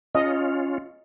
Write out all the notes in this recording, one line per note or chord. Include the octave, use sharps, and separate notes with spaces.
C#4 F4 D#5